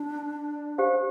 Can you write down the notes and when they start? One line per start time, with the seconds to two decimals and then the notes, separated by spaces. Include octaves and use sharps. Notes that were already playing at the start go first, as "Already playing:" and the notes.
Already playing: D4
0.78 G4 C5 F5